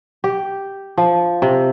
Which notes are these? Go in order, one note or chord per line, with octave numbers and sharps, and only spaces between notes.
G4
F3
C3